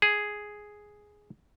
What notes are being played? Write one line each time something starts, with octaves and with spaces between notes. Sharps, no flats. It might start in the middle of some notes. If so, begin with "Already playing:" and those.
G#4